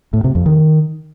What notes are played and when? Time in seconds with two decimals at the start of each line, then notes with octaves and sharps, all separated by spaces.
0.13 A2
0.24 C3
0.35 F2
0.46 D#3